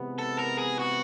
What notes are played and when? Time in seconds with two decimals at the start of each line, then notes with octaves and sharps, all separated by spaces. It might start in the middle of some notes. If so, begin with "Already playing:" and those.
Already playing: C3 E3 G#3 B3
0.18 A4
0.38 A#4
0.58 G#4
0.79 F#4